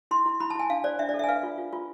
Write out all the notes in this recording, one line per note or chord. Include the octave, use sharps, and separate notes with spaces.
E4 C6
E4
E4 B5
A5
E4 G#5
D4 F5
C5 D5
D4 E5
D5
A4
E5
G#5
B4 F5
F4
F4
F4